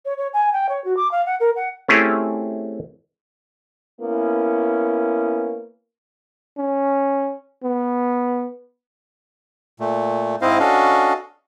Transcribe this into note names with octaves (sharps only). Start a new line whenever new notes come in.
C#5
C#5
G#5
G5
C#5
F#4
D6
F5
F#5
A#4
F#5
A3 C4 C#4 E4 G4 G#4
A#3 B3 C#4 E4
C#4
B3
A#2 A3
G#2 C4 E4 C5 D#5 F5
C#4 D4 F#4 A4 D#5 F5